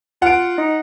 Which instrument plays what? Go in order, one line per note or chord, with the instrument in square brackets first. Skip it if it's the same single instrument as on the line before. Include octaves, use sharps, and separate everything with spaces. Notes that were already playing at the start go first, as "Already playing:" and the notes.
[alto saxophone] F4 [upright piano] F#5 D7
[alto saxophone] D#4